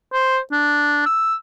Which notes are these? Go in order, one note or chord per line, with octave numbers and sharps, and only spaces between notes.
C5
D4
E6